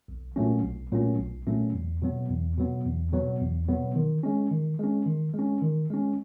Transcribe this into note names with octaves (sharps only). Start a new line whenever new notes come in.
B1
A#2 F#3 A3 C#4
B1
A#2 F#3 A3 C#4
B1
A#2 F#3 A3 C#4
E2
B2 F#3 B3
E2
B2 F#3 B3
E2
B2 F#3 B3
E2
B2 F#3 B3
D#3
G#3 C#4
D#3
G#3 C#4
D#3
G#3
C#4
D#3
G#3 C#4